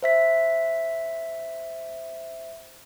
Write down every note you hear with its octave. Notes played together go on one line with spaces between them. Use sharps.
C5 E5 B6